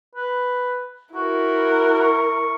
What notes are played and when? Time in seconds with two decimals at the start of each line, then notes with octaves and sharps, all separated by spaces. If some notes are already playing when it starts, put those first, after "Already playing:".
0.15 B4
1.15 E4 F#4 A#4
2.01 C#6